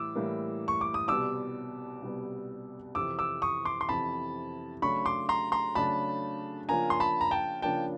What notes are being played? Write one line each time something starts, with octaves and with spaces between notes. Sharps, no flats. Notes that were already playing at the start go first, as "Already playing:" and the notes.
Already playing: A2 E3 G3 D6 E6
A2 E3 G3 A#3
C#6
D6
D#6
C2 B2 G3 B3 D6 E6
C2 B2 G3 B3
F2 C3 E3 D6 E6
D6 E6
C#6 D#6
C6 D6
C6
F2 C3 E3 A5 B5
C#3 F#3 A3 D4 B5 C#6
C6 D6
A#5 C6
A#5 C6
C#3 F#3 A3 D4 A5 B5
C#3 F3 A#3 D4 F4 G#5 A#5
C6
A5 B5
A#5
G5 A5
C#3 F3 A#3 D4 F4 G5 A5